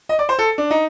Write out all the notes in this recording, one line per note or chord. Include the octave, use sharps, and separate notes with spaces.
D#5
D5
C5
A4
D4
D#4